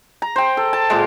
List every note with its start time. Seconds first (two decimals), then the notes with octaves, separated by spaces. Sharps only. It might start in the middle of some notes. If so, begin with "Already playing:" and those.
0.22 A#5
0.36 C5 G5
0.57 A4
0.73 A5
0.90 A#2 G#3